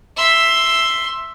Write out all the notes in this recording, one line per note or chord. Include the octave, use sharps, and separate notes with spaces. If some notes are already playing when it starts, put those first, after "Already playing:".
E5 C6